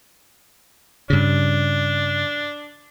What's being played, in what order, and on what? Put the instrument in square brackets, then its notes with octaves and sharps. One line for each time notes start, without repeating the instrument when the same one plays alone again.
[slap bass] G2 C#3 [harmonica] D4